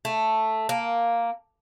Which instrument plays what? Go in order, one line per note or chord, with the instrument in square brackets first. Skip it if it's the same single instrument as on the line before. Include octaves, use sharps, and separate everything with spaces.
[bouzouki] A3
A#3